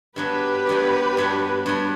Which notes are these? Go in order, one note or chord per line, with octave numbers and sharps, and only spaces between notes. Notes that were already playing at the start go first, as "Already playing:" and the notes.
G2 F#3 B3 D4 G4 B4
G2 F#3 B3 D4
G2 F#3 B3 D4
G2 F#3 B3 D4